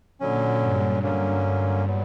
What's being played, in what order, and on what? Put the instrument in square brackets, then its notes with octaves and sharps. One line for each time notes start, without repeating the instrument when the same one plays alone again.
[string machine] A#2 [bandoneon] D3 F#3 C#4
[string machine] G2
[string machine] G2 [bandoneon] D3 F#3 A#3 C#4
[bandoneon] A#2 F#3 B3